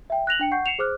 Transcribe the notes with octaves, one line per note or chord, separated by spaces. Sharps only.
E5 G5
F#6 A#6 F7 F#7
D4 G5 C#7
F#5 C#6 G6 C7
C7 C#7 E7 F7
G#4 C5 D6 F6 F#6